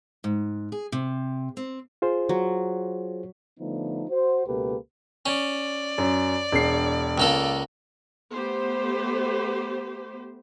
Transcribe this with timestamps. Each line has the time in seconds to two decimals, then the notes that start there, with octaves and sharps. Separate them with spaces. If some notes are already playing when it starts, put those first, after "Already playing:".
0.24 G#2
0.72 G#4
0.92 C3
1.57 C4
2.02 F4 G#4 C5
2.29 F#3
3.60 D3 F3 A3 B3 D4 D#4
4.10 F#4 C5
4.47 C#2 B2 A#3 G4 A4 B4
5.26 C#4 D5
5.98 F#2
6.52 E1 C7
7.18 C#2 A#3 A4
8.32 A3 B3 G4 C5